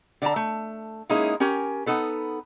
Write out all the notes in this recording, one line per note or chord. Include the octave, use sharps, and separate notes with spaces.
D3 D5 G5 A5 A#5
A3
G#3 A#3 C#4 D#4 E4 G#4
C#4 G4 A#4 G#5
B3 D#4 A4 B4